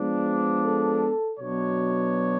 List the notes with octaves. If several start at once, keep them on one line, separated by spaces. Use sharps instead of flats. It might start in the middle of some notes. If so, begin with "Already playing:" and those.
Already playing: F3 G#3 B3 D4
A4
B2 F#3 B3 D4 C#5